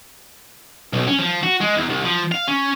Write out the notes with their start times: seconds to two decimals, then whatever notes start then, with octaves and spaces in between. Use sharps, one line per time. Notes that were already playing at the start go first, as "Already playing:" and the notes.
0.93 B1
1.07 C#4
1.19 F3
1.43 F#4
1.61 G#3
1.77 E2
1.89 C2
2.05 F3
2.32 F5
2.48 C#4